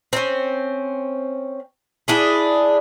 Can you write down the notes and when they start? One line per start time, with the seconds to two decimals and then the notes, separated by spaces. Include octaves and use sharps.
0.13 C4 C#4
2.08 D4 E4 G#4